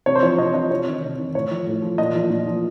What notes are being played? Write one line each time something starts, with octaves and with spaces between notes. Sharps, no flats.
C3 C#5
C5
F3 C#5
C3 D#5
F3 D#5
C3 C#5
D#3
C3
D#3
A2 C#5
F3
A2
F3
A#2 D#5
F3
A#2
F3